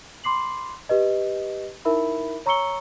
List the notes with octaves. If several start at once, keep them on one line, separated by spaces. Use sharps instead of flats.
B5 C6 D6 C7 F#7
G4 B4 D#5
D#4 E4 A#4 E5 B5
C#5 A#5 C#6 E6 C#7 G7